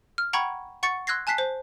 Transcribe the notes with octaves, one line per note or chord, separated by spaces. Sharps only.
F6
F#5 G5 A#5 B5 C#6 G#6
F#5 C#6 A6 C#7
C6 E6 F#6 G#6 A#6 C7
G#5 A5 F#6 B6 C7
C5